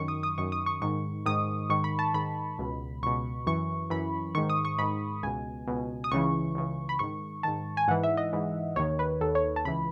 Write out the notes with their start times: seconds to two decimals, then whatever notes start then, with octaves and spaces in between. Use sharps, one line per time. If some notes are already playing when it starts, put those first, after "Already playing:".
Already playing: F#2 D#3 C#6
0.08 D#6
0.23 D#6
0.38 F#2 D#3 C#6
0.52 D#6
0.66 C#6
0.82 G#2 D#3 C#6
1.26 G#2 D#3 D#6
1.69 G#2 D#3 C#6
1.84 B5
1.99 A5
2.14 G#2 D#3 B5
2.58 C#2 B2
3.03 C#2 B2 C#6
3.47 F#2 E3 C#6
3.90 F#2 E3 B5
4.35 G#2 D#3 C#6
4.50 D#6
4.65 C#6
4.79 G#2 D#3 B5
5.23 C#2 B2 G#5
5.67 C#2 B2
6.04 D#6
6.12 C#2 C#3 E3 C#6
6.55 C#2 C#3 E3
6.89 B5
6.99 G#2 D#3 C#6
7.43 G#2 D#3 A5
7.77 G#5
7.88 G#2 E3 F#5
8.03 E5
8.17 D#5
8.33 G#2 E3
8.76 D#2 D#3 C#5
8.99 B4
9.21 D#2 D#3 A4
9.35 C#5
9.56 A5
9.65 C#2 C#3 E3 B5